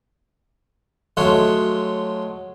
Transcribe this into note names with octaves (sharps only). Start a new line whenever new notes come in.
F#3 G#3 A3 F4 C#5 F#5